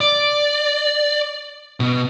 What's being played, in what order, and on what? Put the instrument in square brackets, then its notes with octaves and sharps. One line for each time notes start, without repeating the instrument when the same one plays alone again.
[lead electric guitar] D5
B2